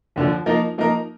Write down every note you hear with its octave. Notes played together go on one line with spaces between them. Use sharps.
D#2 D3 F3
F3 A#3 D#4 A#4
F3 A#3 D#4 A#4